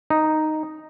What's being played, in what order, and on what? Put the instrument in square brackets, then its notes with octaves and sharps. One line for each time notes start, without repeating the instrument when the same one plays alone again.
[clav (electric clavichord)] D#4